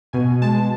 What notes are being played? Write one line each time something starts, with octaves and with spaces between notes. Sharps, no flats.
B2 G#5
G#3 A5